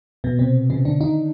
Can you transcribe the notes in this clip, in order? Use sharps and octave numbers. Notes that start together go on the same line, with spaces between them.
B2 B3
C3 C4
C#3 C#4
D3 D4
D#3 D#4